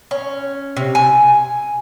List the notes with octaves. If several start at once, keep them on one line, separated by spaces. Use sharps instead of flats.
C#4
C3
G#5